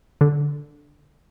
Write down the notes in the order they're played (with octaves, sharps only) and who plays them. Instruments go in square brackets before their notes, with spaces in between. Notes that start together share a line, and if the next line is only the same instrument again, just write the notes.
[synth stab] D3